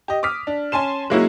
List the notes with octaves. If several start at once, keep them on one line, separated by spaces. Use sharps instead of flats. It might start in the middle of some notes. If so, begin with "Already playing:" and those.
G4 D#5
D6 D#6 F6 B6
D4
C#4 G#5 A5 C6 E7
F#3 G#3 A#3 C#4 E4 F#4